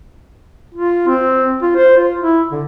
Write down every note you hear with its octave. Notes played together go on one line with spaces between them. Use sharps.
F4
C4
F4
C5
F4
E4
D3